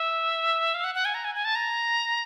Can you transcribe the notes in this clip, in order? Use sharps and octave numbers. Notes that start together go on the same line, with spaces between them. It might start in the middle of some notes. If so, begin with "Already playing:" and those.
Already playing: E5
F5
F#5
F#5
G#5
A#5
G#5
G#5
A5
A#5